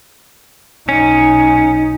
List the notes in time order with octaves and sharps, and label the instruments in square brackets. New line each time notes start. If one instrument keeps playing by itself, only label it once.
[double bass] B1 D#4 [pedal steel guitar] C#4